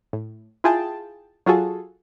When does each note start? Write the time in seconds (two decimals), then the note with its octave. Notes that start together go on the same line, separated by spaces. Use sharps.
0.13 A2
0.64 E4 F4 G#4 G5 A5
1.46 F#3 F4 F#4 G#4 A4